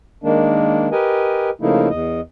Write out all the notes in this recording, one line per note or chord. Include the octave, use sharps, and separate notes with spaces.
D#3 G#3 A#3 D4
G4 A#4 B4 D#5 G#5
C#3 F3 A3 A#3 D#4 E4
E2 D#5